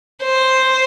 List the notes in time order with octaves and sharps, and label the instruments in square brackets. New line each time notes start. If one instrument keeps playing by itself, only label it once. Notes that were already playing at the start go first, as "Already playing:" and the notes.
[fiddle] C5